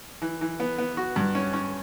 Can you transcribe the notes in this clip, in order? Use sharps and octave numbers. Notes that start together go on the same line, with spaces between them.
E3
E3
B3
B3
F#4
G2
C#4
C#4